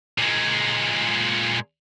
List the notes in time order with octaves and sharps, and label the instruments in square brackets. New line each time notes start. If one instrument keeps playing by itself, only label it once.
[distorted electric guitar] A#2 G#3